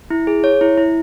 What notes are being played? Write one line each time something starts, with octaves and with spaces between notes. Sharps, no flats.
E4
G#4
C#5
E4
E4